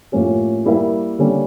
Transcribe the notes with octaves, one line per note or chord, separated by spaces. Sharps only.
A2 F3 A#3 C#4 G4
G3 A#3 E4 A#4 E5
D3 G3 A#3 C#4